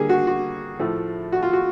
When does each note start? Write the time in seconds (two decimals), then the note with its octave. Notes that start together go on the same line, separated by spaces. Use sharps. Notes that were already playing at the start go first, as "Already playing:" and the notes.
Already playing: D3 G3 A#3 G#4
0.09 F#4
0.27 F#4
0.79 A2 F3 A3
1.32 F#4
1.43 F4
1.53 F#4